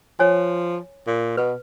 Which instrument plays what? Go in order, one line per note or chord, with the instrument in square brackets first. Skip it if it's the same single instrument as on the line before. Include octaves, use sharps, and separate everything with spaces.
[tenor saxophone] F3 [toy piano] C#5 G#5
[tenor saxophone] A#2
[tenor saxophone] B2 [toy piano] B4